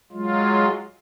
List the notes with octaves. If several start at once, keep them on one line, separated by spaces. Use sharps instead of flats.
F#3 G#3 F4